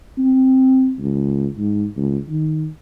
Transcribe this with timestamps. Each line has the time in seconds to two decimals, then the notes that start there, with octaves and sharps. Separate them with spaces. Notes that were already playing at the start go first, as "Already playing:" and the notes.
0.18 C4
0.99 C#2
1.58 G#2
1.97 C#2
2.29 D#3